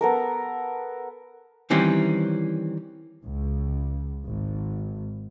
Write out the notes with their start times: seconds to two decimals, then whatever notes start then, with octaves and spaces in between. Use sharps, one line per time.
0.01 B3 A4 A#4
1.70 D#3 E3 G3 C4 C#4
3.22 C#2
4.26 G#1